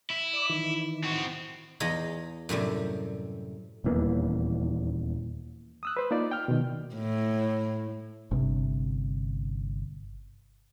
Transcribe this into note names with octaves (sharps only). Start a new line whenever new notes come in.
E4
D5 D6
D#3 E3
C4 F#4
E2 G#4 D#5 F5 A#5 B5
F#2 A2 C3 G3
D#1 E2 E3 A#3
D#6 E6 F#6
B4 C5
A#3 D#4 F4 D5
G5 F6
B2 D#3
A2
G1 C3